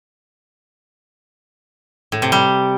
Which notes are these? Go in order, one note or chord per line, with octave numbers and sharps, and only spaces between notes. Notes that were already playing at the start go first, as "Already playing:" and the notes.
A2
C3
G3